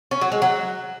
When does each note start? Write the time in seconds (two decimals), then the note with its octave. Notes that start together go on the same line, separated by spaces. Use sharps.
0.11 C#4
0.21 F#3
0.32 G#3
0.42 F#3